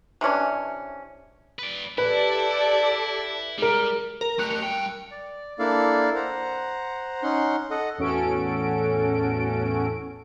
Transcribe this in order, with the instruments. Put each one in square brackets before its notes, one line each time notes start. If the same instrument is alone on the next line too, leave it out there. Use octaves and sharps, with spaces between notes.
[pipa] C3 E3 C#4 D4
[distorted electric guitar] B4 D5
[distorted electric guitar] E4 [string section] G4 A4 D5 [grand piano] B4
[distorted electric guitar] G3 [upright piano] G#3 A#4
[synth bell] A#4
[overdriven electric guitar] A3 G4 [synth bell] F#6 C#7 F7
[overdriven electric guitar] G2 G5
[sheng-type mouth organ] D5
A#3 D4 E4 A4 D5 F5
C5 F#5 A#5
C#4 D#4 F#5 C6
A4 D#5 F#5
[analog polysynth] E2 A2 C#4 F#4 A4 D7